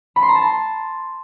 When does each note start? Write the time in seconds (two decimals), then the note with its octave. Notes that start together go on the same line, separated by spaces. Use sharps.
0.16 B5
0.22 C6
0.29 A#5
0.35 A5
0.42 C6